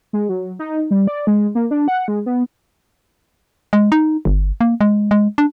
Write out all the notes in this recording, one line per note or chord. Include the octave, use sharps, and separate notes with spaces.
G#3
F#3
D#4
G3
D5
G#3
A#3
D4
F#5
G#3
B3
G#3
D#4
G1
A#3
G#3
G#3
D4